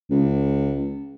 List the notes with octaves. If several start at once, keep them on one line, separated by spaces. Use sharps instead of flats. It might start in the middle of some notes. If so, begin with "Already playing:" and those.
C#2